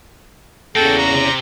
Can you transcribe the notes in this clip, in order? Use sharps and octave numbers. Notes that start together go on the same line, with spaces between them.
E2 C#3 A#3 F#4 A4 G5
A#5
C3